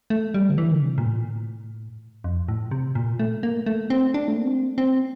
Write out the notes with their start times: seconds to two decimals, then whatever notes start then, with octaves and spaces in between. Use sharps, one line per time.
0.10 A3
0.34 G3
0.49 D3
0.58 E3
0.71 D3
0.82 C3
0.98 A#2
1.06 A2
2.24 F2
2.48 A2
2.71 C3
2.95 A#2
3.19 A3
3.43 A#3
3.66 A3
3.90 C4
4.14 D4
4.28 A3
4.37 A#3
4.46 C4
4.78 C4